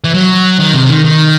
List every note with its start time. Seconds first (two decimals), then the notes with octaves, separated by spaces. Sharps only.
0.04 E3
0.14 F#3
0.59 D#3
0.74 C3
0.89 D#3
1.05 D#3